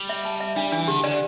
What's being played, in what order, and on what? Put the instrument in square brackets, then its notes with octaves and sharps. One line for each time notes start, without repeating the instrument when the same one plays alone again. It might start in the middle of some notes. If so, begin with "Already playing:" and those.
Already playing: [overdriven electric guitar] G3
[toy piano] E5
A5
E5
[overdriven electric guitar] G3 [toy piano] D4
[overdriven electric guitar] E3 [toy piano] D4
[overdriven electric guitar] D3 [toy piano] G4
[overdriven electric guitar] D3 [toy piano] D5